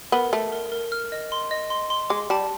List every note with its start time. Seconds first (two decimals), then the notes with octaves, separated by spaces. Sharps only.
0.12 B3 A#4
0.33 A3 E5
0.52 A#4
0.72 A#4
0.92 F6
1.12 D#5
1.32 C6
1.51 D#5
1.70 C6
1.90 C6
2.10 G#3 D6
2.30 G3 A5